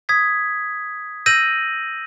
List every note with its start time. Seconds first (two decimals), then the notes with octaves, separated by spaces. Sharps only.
0.09 D#6 G#6 B6
1.26 E6 G6 A#6 D#7 F#7